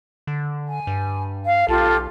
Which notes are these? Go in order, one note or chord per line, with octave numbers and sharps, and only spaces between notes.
D3
G#5
G2
F5
B1 F4 G4 A4